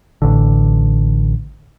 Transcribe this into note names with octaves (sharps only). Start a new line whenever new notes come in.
A1 D3